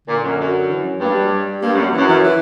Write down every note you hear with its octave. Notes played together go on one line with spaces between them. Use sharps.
A#2 D3
F#2
F#2
E3
F#3
G2 A#3
G3
F#3
G3
G2 A#3
F#2 F#3
F#2 E3
E3
E3